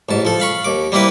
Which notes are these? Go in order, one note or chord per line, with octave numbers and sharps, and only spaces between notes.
A1 G#2 A5
F3 A4
F5 B5 C#6
D#2 D6
G3 A#3 C4 E4 B4